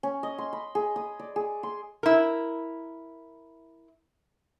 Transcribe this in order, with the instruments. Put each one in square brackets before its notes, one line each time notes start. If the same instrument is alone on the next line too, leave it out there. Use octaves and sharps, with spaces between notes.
[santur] C#4
D#5
C6
B5
G#4
D#6
D5
G#4
C6
[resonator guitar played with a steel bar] E4 A#4